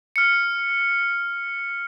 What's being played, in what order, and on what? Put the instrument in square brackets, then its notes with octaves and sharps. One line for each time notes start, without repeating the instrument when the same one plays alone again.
[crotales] F6 C#7